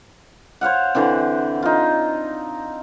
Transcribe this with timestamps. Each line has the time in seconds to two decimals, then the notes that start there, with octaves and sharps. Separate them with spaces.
0.61 C5 C#5 F5 F#5
0.95 D3 E3 C4
1.63 D#4 F4